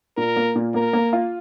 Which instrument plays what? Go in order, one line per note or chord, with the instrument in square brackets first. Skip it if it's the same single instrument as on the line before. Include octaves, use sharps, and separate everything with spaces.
[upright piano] A#2 [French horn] A#4
[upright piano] A#3
A#2
[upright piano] A#3 [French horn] A#4
[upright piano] A#3
F4